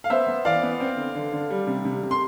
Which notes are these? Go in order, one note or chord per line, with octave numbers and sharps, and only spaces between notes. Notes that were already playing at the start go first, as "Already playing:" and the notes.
F5
B3 C5 E5
B3
E3 D5 F5
B3
C4
D3
D3
D3
G3
C3
C3
C3
C6